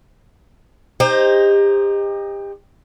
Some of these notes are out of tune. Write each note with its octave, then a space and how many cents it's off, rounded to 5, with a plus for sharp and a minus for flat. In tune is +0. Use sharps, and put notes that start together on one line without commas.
D#4 +0 G4 +30 C5 +0